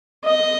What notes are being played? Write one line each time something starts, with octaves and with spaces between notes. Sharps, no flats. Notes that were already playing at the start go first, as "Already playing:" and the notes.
D#5